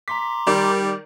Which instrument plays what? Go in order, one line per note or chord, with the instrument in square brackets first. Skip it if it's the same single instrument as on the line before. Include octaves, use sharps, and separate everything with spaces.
[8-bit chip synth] A#5 C6 D6 [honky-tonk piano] B6
[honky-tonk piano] D#3 D5 [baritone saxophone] G3